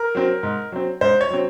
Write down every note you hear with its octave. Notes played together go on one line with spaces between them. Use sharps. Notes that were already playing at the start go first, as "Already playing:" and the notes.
Already playing: A#4
F#3 C4
G#2
F#3 C4
G#2 C5
C#5
F#3 C4